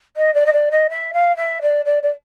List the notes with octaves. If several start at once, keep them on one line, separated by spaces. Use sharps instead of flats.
D#5
D5
D#5
D5
D#5
E5
F5
E5
D5
D5
D5